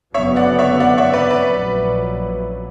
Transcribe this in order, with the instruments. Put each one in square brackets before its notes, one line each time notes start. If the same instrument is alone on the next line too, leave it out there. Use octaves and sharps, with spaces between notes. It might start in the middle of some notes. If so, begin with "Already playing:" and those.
[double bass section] F#1 F#2 D3 F#3 B3 [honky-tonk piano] C#5 E5
[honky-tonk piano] D5 F#5
C#5 E5
D5 F#5
C#5 E5
B4 D5
B4 D5
[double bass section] A#1 A#2 F#3